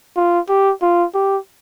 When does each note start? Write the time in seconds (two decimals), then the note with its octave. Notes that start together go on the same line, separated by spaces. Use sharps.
0.16 F4
0.49 G4
0.82 F4
1.14 G4